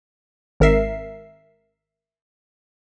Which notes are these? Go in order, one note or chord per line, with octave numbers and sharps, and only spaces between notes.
G#1 A#4 E5 C7